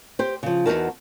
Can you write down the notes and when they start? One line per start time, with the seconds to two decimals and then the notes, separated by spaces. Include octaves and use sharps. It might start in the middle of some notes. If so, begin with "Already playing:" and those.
0.19 G4 C5
0.43 C#3 F3
0.66 E2 G#2 D#4 F#4 A#4 A5